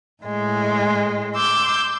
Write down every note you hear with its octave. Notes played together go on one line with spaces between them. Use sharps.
A2 G#3
C6 D6 E6 G6